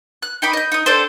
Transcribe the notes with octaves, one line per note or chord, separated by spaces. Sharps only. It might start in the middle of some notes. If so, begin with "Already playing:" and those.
F#6
D#4 G5 B5 D6
D#5 G6
D#4 D#6
C4 D4 A4 C5